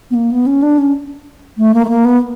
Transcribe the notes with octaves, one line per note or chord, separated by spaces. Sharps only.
B3
A#3
B3
C#4
D4
C#4
A3
A#3
A3
A#3
B3